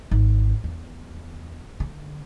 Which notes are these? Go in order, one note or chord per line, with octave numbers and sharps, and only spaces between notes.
G#1
E2
D3